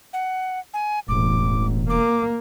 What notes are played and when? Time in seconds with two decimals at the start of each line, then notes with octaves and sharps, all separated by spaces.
0.13 F#5
0.74 G#5
1.09 E1 A1 D6
1.90 A#3 D6